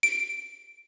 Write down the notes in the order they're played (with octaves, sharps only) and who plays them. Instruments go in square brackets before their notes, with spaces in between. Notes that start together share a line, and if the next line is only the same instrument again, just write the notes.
[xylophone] D7